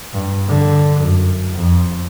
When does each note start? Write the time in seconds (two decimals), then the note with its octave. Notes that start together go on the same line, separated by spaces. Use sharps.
0.13 G2
0.47 D3
1.00 F#2
1.53 F2